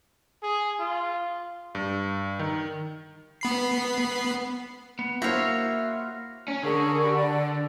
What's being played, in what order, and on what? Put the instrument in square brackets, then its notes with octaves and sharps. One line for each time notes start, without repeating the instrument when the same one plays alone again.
[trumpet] G#4
F4
[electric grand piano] G2
D#3
[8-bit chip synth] B3 B5 C7
[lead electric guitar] B3
[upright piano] A#3 E4 C5 [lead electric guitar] F#4 F5 [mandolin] C#5 E5
[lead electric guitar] C#4
[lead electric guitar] D3 [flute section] G#4 A#4 C#6
[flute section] G4 B5 C#6
D5